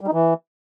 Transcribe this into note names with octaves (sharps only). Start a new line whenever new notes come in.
G3
D#4
E3